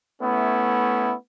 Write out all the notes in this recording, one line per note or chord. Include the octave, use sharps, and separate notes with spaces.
A3 B3 C#4 E4